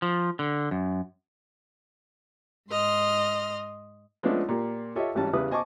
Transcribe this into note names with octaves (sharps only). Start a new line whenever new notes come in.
F3
D3
F#2
G#2 D#5 C6 F6
F3 G#3 A3 B3 C#4 D4
A#2 A#3 G4
F4 G4 A4 C#5 D#5 E5
G#1 E3 G3 C#4 A5
E2 C#3 G3 E4 B4 D#6
C5 D#5 G#5 A5 C#6 D6